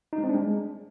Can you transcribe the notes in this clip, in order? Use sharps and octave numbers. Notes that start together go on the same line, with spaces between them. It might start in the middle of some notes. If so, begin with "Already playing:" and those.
D#4
G#3
C4
D4
G#3